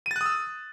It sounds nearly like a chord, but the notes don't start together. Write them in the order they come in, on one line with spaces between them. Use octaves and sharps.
D#7 A6 F#6 D#6 E6